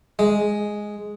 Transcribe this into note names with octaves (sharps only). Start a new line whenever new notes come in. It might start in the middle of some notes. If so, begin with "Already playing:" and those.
G#3